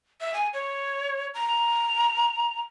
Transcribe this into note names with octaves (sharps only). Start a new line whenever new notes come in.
E5
G#5
C#5
A#5